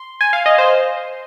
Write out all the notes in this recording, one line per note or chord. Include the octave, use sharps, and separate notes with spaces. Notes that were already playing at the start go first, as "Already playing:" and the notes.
Already playing: C6
G#5
F5
D#5
C5